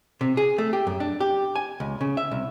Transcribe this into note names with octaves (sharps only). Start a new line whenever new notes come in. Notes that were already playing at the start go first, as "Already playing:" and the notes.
C3
G#4
A3
G4
F#2
D4
G4
G#5
C#2
C#3
E5
C2